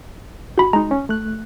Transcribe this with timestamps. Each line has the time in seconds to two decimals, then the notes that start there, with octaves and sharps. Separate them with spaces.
0.58 F#4 B5
0.73 G#3 D#4 A#5
0.91 C#4
1.09 A3 F#6